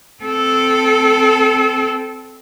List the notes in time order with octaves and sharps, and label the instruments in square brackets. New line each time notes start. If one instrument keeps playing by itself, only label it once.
[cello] C4 A4